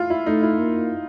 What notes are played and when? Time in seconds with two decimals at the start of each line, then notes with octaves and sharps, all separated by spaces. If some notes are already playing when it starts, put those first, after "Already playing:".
Already playing: E4 F4
0.10 E4
0.26 A3 D#4
0.43 E4
0.59 A#3